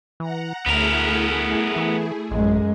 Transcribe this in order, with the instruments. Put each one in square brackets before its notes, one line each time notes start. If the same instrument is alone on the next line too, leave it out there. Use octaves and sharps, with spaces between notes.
[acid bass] E3 [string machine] F#5 A#5
[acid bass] D2 [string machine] A3 E4 G#4 [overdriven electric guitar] B3 A#4
[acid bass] E3
[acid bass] A1 [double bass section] F#2 G#3